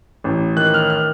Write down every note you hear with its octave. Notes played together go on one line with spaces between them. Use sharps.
A1
D#3 F#6
F6
F6